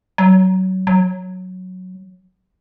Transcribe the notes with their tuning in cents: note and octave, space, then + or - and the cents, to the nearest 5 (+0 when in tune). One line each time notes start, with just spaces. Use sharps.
F#3 +20
F#3 -5